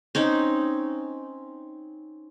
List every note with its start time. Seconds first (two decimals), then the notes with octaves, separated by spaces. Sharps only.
0.15 C4 C#4 D#4